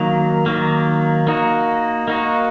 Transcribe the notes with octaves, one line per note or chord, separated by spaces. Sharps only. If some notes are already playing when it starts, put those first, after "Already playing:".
Already playing: D#3 F#3 A#3
D#3 F#3 A#3
A#3 D#4 F#4
A#3 D#4 F#4